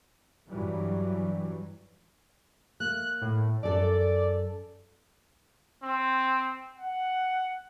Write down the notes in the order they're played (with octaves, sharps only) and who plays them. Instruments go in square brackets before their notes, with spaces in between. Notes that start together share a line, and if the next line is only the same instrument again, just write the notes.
[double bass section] G2 E3 F#3 G3
[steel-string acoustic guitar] A#3 [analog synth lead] F#6
[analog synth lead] A2
[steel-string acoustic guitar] F#2 A4 [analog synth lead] D5
[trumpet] C4
F#5